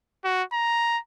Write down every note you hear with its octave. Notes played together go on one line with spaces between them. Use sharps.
F#4
A#5